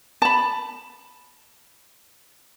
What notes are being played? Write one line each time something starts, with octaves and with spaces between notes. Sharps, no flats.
A5 B5